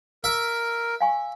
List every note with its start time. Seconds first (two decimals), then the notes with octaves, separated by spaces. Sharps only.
0.24 A#4 E5
1.01 F5 G#5 C#6